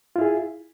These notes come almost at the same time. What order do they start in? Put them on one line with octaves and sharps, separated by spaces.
F4 E4 G#4